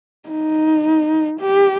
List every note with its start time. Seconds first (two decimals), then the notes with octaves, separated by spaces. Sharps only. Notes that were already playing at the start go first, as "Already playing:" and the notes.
0.29 D#4
1.41 G4